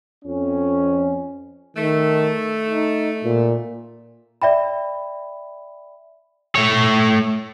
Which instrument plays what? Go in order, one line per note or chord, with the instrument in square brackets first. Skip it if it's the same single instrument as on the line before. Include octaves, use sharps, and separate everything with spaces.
[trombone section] F2 C#4
[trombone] D#3 [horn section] A3
[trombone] D#4
A#2
[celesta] D5 E5 G5 B5
[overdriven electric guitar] A3 C#5